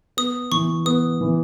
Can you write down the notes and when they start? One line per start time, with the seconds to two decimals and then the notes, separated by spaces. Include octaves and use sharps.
0.17 B3 D#6
0.52 E3 C#6
0.86 B3 D#6
1.21 E3